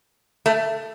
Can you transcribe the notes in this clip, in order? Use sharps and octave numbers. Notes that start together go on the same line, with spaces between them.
A3